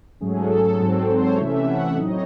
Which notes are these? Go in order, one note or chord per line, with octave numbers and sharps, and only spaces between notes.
G#2 F#3 A3 C#4 G#4
A4
A4
G#2 F#3 C4
C5
C#5
C3 E3 A3 C#4 E5
E5
F#5
E5
A2 F#3 C4 D#4 D#5
C#5